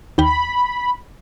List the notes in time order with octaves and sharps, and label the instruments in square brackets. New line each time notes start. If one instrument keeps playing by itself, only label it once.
[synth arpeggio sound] D#2 G5 [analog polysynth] B5